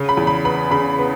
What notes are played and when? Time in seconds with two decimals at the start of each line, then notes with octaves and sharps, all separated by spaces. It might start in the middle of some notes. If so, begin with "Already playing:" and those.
Already playing: C#3
0.09 B5
0.17 E2
0.27 B5
0.44 B3 B5
0.71 C#3 B5
0.99 B3